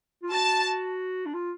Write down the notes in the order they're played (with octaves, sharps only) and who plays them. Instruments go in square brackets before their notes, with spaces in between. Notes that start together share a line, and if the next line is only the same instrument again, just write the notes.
[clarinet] F4
[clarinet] F#4 [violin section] A5
[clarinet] D4
F4